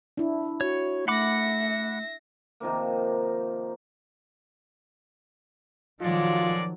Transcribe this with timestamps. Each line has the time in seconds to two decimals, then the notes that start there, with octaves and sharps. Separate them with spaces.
0.17 D4 E4
0.61 F#4 C#5
1.08 A3 E5 F#5 B5 D6 A#6
2.60 C3 D#3 F3 A#3
6.01 D#3 F3 F#3 G#3 F4 A4 D5